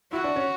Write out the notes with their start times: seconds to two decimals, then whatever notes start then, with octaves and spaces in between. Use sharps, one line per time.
0.13 E4 F#4
0.24 D4
0.36 C#4